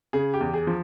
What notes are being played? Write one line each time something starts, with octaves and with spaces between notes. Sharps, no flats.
C#3 G#4
G4
E2
G#4
F3